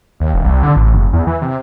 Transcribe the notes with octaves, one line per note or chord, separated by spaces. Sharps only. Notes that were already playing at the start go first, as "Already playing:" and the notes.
D#2
E1
C2
D3
A1
F#1
E2
E3
C3